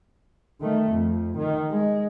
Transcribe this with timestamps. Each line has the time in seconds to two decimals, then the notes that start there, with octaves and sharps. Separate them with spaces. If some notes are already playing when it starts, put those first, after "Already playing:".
0.61 D#3 A3
0.92 F2
1.38 D#3
1.71 G#3